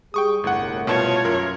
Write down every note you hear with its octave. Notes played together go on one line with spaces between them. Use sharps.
G3 G#4 G5 C#6 D#6
G1 C2 A2 F#5
B2 F4 C#5 A5 C#7
F#2 A#4